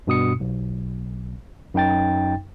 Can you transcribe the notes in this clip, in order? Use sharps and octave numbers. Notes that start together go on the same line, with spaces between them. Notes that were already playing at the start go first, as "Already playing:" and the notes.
G2 B2 D#6 C#7
B1
F#2 D#4 G5 A6